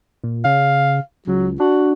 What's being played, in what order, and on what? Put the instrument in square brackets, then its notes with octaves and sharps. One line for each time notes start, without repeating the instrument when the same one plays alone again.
[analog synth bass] A#2
[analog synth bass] C#3 [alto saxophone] F5
[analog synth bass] C#2 [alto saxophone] F#3
[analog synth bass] D4 [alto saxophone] F#4